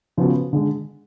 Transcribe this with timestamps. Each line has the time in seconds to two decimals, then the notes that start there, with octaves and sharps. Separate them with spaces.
0.17 C#3 F3 B3 F#4
0.53 D3 G#3